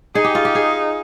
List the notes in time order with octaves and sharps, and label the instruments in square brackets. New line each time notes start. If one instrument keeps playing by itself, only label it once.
[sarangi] D#4 [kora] G#4
[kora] G4
F4
G4
G#4